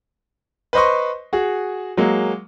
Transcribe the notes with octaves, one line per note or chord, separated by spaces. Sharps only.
B4 C5 D#5 C6 C#6
F#4 G#4
F#3 G#3 A#3